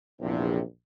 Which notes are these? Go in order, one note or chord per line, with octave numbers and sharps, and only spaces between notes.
A#1 E2 C3